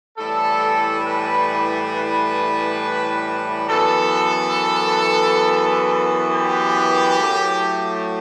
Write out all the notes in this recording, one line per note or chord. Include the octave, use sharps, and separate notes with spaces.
A2 E3 G3 A4
B4
B4
F#2 E3 B3 A4
G4
A2 F#3 A3